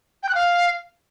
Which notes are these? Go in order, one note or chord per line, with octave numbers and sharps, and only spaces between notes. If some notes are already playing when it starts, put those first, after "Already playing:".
G5
F#6
F5